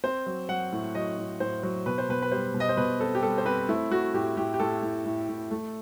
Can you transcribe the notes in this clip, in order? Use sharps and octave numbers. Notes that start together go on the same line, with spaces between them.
C4 C5
F#3
F#3 F#5
A2
F#3 D#5
A2
A2 C5
F#3
B2 B4
C5
B2 B4
B4
G3 C5
B2
D#5
C5
B2 B4
C4 A4
G4
G3 A4
C5
C4 B4
A3 E4
A3 F#4
A2 G4
A2 G4
G4
A2 A4
A2
A2
A2
A3